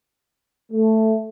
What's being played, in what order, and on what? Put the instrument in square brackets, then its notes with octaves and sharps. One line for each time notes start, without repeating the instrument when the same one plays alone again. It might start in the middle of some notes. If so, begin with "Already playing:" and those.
[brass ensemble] A3